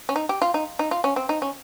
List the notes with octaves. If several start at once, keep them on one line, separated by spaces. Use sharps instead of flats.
C#4
D#4
G4
F4
D#4
D#4
F4
C#4
C4
D#4
C#4